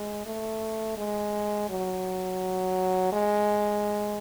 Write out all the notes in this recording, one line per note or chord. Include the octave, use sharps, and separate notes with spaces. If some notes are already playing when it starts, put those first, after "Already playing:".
Already playing: G#3
A3
G#3
F#3
G#3